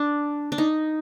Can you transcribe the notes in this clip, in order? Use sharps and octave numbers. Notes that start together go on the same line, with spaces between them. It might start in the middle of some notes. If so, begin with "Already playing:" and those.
Already playing: D4
D4
D#4